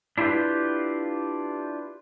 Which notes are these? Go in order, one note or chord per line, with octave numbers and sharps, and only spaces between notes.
D4 E4 F4 G4 B4